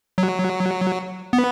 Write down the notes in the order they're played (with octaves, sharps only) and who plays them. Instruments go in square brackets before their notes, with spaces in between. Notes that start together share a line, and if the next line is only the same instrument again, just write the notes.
[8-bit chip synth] F#3
B3